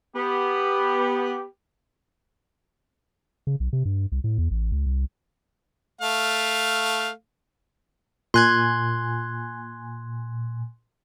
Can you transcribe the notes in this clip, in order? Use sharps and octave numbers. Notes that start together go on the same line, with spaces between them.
B3 G4
C#3
B1
C3
G2
C2
A2
E2
A1
C#2
C2
A3 F5
A#2 G#5 C6 F#6 G#6